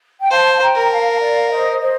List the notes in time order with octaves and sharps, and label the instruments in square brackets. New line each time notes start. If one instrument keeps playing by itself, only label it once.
[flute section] G5
[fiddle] C5 [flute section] F5 A5
[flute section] G5 A#5
[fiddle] A#4
[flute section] F5 A5
D5 F5
C5 D#5
C5 D#5